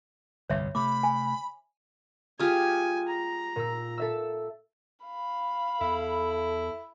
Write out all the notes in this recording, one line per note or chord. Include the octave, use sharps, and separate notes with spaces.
G1 C2 F2 C#5 E5
C3 A3 B5 D6
G#5
G#3 F4 G4 G#5 D#6 F6
A#5
A#2 E6
A4 E5 E6
F5 B5
E2 E4 A4